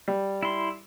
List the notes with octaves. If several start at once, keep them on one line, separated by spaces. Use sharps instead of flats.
G3
E4 C6